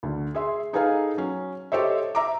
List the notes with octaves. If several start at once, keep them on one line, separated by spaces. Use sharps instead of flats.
D2 D3
G#4 E5 C6
D#4 G#4 A4 B4 F5 G#5
F#3 C#4
G4 A4 C5 C#5 D#5 E5
E5 A#5 D6